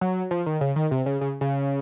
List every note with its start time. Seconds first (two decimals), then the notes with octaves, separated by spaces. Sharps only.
0.01 F#3
0.31 F3
0.46 D#3
0.61 C#3
0.76 D#3
0.91 C3
1.06 C#3
1.21 C#3
1.41 C#3